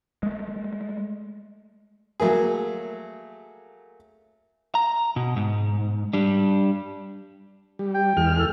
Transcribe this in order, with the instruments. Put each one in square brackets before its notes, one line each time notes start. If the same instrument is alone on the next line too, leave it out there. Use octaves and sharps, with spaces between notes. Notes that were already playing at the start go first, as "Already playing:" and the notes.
[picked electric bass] G#3 A3
[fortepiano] F#3 A3 A#3 G#4
[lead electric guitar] A#5
B2
G#2
G3 D4
[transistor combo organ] G3
[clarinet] G5
[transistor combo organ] E2 G#3 F6
[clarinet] A4